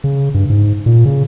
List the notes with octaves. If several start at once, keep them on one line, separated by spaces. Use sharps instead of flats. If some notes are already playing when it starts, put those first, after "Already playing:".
C#3
G2
G#2
A#2
C#3